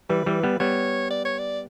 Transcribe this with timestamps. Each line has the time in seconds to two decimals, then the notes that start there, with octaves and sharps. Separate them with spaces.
0.10 E3 G3 B4
0.26 E3 G3
0.43 G3 B3
0.60 G3 B3 C#5
1.10 D5
1.25 C#5
1.39 D5